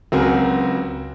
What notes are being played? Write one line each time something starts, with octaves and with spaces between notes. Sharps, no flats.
C#2 F#3 C4 F#4 A#4 G#5